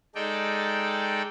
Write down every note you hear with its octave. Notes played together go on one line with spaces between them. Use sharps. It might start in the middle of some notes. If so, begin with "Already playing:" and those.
G#3 D#4 A4 D5 G5